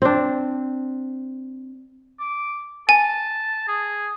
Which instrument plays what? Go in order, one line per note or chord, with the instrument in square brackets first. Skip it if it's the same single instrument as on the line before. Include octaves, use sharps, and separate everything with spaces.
[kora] C4 D4
[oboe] D6
[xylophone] G#5 [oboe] A5
[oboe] G#4